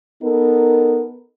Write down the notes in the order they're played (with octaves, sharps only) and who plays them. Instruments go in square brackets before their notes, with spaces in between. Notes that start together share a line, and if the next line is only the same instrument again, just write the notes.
[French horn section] B3 D#4 A4 A#4